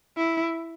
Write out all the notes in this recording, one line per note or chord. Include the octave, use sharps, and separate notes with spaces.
E4